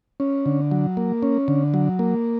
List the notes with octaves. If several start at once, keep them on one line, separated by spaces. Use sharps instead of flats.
C#4
D3
F#3
A#3
C#4
D3
F#3
A#3